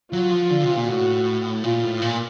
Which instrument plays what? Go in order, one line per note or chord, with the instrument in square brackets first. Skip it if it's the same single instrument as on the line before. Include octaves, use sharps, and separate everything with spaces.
[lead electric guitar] F#3 [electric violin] F4
[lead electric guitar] F3
D3
C3
A#2
[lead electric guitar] A2 [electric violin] F#4
[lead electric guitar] A#2 [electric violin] F4
[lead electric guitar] A2
A#2